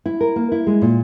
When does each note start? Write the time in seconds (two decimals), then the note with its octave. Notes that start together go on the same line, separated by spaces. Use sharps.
0.06 E4
0.21 A#4
0.36 A#3
0.52 E4
0.67 G#3
0.82 A#2